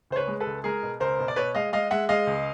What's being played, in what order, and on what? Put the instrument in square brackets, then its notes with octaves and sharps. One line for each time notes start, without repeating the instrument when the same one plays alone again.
[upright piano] C#2 C5
B4 C#5
G#3
A4 B4
C#2
G#3 G#4 A#4
B2
C#2 A#4 C5
B2
D5
B2 B4 C#5
G#3 D#5 F5
G#3 D#5 F5
G#3 E5 F#5
G#3 D#5 F5
C#2